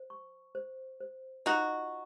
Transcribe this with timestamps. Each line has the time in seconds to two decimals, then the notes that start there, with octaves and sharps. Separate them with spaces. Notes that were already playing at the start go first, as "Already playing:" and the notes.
Already playing: C5
0.10 C#6
0.55 C5
1.01 C5
1.46 D#4 F4 F#4